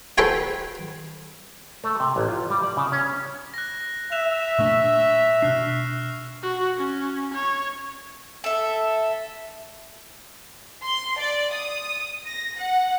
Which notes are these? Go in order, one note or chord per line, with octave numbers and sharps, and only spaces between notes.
A4 B4 C5 G5 G#5
A3
C3
A1
F4
G3
D5
C#3
C#4
F#6 A#6
E5 F#6 E7 F7
A#2 A3 D4 C#6 E6 E7
B2 D4 F6 F#6 C7
F#4
C#4
C#5
A4 E5
C6
D5
D#6
A#6
F#5